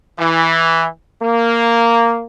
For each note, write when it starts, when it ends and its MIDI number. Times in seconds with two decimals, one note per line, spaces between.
0.19 0.86 52
1.21 2.23 58